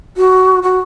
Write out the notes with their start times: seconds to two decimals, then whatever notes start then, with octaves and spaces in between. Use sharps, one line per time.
0.17 F#4
0.63 F#4